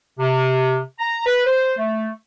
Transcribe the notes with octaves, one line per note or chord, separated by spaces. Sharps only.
C3
A#5
B4
C5
A3